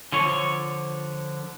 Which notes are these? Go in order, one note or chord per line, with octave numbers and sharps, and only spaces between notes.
D3 F3 C#5